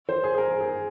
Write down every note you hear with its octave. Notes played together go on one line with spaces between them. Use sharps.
C5
G#4
G#4
A#4
G#4